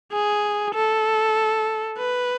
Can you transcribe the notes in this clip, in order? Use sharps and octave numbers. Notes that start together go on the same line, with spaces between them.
G#4
A4
B4